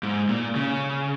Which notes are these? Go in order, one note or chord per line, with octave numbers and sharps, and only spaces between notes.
G#2
A#2
C#3